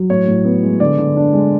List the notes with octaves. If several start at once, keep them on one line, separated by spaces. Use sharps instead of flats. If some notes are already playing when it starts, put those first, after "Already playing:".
Already playing: F#3
A2 C#5
A2
B3
G#3
D3 D5
D3
D4
G#3